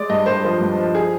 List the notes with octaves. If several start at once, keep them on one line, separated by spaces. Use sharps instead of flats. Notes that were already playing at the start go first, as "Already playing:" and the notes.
Already playing: G#3 D5
G2 D#5
G2 C5
F3 C5
G2
F3
G#4